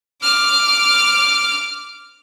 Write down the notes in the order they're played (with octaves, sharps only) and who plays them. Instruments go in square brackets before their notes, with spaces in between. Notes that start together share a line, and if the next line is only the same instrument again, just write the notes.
[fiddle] D6 F6